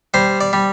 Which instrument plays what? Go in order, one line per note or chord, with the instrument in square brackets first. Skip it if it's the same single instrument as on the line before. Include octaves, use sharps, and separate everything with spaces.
[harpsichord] G3 C5
D5
G3